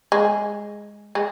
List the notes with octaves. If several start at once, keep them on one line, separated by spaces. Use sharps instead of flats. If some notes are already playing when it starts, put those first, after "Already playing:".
G#3
G#3